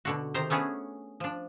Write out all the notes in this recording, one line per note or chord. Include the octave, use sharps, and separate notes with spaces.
B2 D3 F#4
C3 D#3 C5 A#5
A3 B3 C#4 D4 G#4
F3 D4